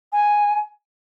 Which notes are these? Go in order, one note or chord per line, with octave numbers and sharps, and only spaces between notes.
G#5